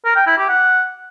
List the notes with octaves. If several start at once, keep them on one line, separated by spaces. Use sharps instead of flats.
A#4
G5
E4
G4
F#5